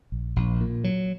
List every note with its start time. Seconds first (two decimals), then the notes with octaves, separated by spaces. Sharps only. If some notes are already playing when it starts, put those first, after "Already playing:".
0.12 A#1
0.36 A#1
0.61 A#2
0.84 F#3